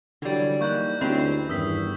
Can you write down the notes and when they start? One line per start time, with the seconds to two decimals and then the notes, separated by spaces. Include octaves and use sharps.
0.22 D3 E3 F#3 G3
0.61 A#3 D#4 C#6 F#6 G6
1.01 D2 C4 C#4 D#4 E4 G4 B4
1.49 E2 G2 D#3 D#6 E6 B6